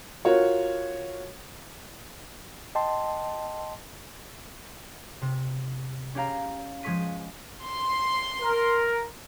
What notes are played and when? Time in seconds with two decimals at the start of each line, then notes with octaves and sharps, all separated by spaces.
0.25 F4 F#4 A#4 C#5
2.75 D#5 G5 A5 C6
5.22 C3
6.15 C#4 G4 F5 A#5
6.83 F3 G#3 G#4 C#6 B6 D#7
7.65 C6
8.40 A#4